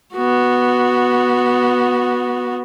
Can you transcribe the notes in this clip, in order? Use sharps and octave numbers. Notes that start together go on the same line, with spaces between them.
B3 F#4